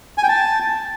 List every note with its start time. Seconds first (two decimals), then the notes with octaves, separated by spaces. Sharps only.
0.18 G#5
0.23 G5
0.28 A5